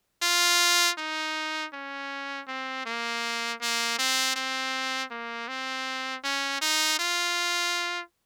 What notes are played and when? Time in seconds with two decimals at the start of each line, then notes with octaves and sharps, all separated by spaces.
0.23 F4
0.98 D#4
1.73 C#4
2.48 C4
2.86 A#3
3.61 A#3
3.99 C4
4.36 C4
5.11 A#3
5.48 C4
6.24 C#4
6.61 D#4
6.99 F4